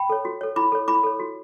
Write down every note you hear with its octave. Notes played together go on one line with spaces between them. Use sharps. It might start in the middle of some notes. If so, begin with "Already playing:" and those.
Already playing: G5 B5
A4 C#5
F#4
A4 C#5
E4 B5 D6
A4 C#5
E4 B5 D6
A4 C#5
F#4